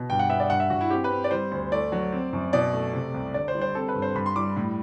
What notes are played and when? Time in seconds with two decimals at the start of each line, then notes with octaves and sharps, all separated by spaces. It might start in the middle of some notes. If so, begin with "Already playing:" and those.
Already playing: B2
0.10 G2 G5
0.19 F#5
0.30 B3 E5
0.40 D5
0.50 G2 F#5
0.60 E5
0.70 G2 F#4
0.81 E4
0.91 C4 G4
1.04 B4
1.10 C4
1.24 D5
1.31 G3 C5
1.51 D2
1.72 A3 D5
1.92 F#3
2.12 C4
2.33 F#2
2.53 B2 D5
2.73 A3
2.93 C3
3.14 C2
3.34 D3 D5
3.48 C5
3.55 G3
3.61 C5
3.75 C4 A4
3.89 B4
3.95 G2
4.02 C5
4.15 G2 B5
4.26 C6
4.36 G3 D6
4.56 A2